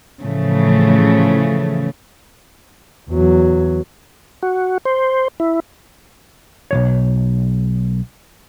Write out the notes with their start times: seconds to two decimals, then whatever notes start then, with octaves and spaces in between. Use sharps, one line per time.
0.21 A2 C#3 E3 F3 A3
3.10 E2 F#3
4.43 F#4
4.85 C5
5.40 E4
6.71 B1 C#3 C#5